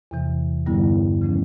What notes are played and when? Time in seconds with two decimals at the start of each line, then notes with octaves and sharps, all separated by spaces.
0.11 E2 C3 E3
0.66 G2 D3 G3 B3 E4
1.22 C#3 F3 A3 C#4